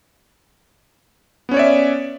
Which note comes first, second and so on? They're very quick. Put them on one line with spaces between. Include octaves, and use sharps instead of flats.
B3 C#4 C#5 D5 E5